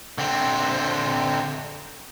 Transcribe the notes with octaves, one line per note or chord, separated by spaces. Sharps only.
D3 C4